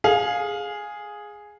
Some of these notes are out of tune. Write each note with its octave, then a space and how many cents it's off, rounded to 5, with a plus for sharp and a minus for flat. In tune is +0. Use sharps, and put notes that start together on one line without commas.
G#4 +0 F5 +20